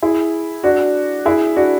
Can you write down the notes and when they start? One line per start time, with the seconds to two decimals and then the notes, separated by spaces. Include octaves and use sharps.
0.03 E4 G#4
0.64 D4 F#4
1.26 E4 G#4
1.56 D4 F#4